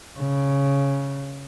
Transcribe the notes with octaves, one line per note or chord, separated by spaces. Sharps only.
C#3